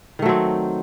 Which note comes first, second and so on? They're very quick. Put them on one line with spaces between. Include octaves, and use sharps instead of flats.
D#3 A3 F#3 C4